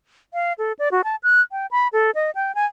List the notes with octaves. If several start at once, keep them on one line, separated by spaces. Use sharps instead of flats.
F5
A4
D5
F#4
A5
F#6
G5
B5
A4
D#5
G5
G#5